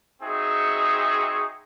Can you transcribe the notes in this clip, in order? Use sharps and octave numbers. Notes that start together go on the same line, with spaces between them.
C4 D#4 F#4 G#4 E5 C#6